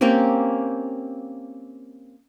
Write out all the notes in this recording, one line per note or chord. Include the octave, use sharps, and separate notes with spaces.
A#3 C4 C#4 G4